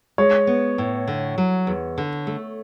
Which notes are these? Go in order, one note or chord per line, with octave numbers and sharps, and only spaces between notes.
G#3 C#5
B3
A2
D3
F#3
E2
D3
A3